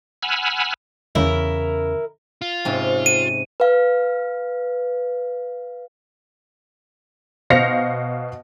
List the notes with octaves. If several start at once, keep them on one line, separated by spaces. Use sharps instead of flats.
F#5 G#5 B5 E6 F6
E2 C#3 E4 A#4
F4
G#2 C3 C#4
D#7
B4 F5
B2 C5 F5 A#6 C#7 F7